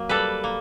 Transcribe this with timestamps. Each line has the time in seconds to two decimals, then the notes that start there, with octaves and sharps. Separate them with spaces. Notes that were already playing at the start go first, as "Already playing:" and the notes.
Already playing: F#3 A#3
0.09 G3 A4 B4
0.44 A#3